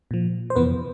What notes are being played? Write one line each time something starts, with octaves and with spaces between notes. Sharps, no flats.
A#2 F3
C5
F2 C3 E3 B3 B4